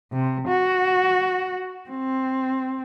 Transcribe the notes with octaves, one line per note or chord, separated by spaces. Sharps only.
C3
F#4
C4